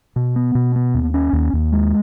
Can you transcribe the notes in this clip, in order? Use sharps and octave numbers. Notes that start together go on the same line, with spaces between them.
B2
B3
B2
B3
D#2
C#4
D#2
D#2
G#3